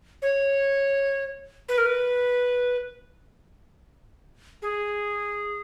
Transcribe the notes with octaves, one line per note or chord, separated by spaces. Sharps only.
C#5
B4
A#4
B4
G#4